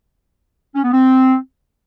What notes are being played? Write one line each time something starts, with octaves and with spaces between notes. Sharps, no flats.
C#4
B3
C4